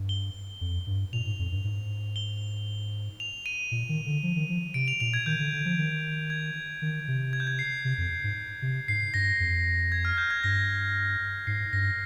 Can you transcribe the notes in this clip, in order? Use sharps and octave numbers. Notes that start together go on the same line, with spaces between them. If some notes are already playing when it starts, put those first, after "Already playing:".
Already playing: G2
G7
F2
G2
A#2 F7
G#2
F2
G2
G#2
G7
F7
D#7
A#2
D#3
D3
F3
D#3
F3
C3 D7
F7
A#2 F7
G#6
D#3 G6
D3
D3
F3
D#3
G#6
D#3
C3
G#6
G6
G#6
C7
C3
F2
G#2
C3
G#2 C7
G2 A#6
F2
G#6
F6
G6
G#6
G2 A#6
G#2 C7
G2 A#6